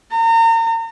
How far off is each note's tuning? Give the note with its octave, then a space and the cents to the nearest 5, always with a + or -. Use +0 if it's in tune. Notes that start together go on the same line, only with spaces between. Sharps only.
A#5 -35